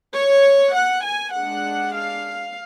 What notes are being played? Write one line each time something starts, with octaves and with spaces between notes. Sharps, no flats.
C#5
F#5
G#5
G#3 D4 F#5
F5